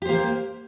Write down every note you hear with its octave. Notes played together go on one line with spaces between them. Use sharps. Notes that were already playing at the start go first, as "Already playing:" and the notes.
A#3 G4 C5